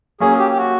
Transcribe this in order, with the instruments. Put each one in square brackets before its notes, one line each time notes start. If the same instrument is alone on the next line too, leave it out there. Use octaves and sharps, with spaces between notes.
[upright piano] F#3 A#3 C#4 [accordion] G#4
[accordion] G4
G4
F#4